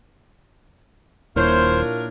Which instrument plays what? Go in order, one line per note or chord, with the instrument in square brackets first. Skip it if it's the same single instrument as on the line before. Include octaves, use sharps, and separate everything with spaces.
[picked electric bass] D#1 [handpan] A#2 E4 C#5 [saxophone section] D4 F4 A#4 [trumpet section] C5